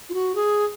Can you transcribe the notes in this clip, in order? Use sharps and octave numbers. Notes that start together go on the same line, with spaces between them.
F4
F#4
G#4